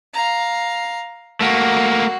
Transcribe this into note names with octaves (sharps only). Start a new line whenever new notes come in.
F5 A#5
A3 A#3 F#4